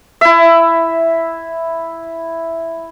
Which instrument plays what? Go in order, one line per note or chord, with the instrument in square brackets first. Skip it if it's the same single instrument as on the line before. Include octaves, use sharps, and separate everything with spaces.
[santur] E4 E5